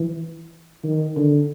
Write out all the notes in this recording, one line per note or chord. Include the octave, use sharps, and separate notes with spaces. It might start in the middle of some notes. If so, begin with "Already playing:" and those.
Already playing: E3
D#3
D3